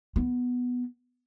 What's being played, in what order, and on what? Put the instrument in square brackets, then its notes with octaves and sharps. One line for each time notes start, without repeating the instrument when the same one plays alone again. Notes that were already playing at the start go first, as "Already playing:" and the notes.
[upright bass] B3